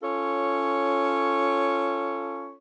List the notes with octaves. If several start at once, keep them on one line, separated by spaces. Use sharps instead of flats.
C#4 F4 A4 C#5